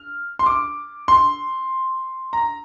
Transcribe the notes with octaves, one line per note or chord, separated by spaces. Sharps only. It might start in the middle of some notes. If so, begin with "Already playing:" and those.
Already playing: F6
C6
D6
C6
A#5